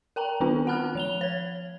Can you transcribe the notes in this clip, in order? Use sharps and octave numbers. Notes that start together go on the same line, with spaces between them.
A#4 G5 A5 A#5
D#3 B3 C4 D4 F4
F#5 A5 B5 F6 F#6
F3 F7 G7
C#5 G#6